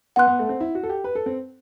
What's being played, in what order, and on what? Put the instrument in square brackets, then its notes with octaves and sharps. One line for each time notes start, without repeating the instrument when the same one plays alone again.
[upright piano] B3 [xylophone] F#5 C6 F#6
[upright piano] B3
A3
C4
E4
F#4
A4
G4
B4
A4
C4